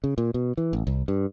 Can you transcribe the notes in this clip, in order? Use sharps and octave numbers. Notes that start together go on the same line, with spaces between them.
C#3
A#2
B2
E3
A1
C2
G2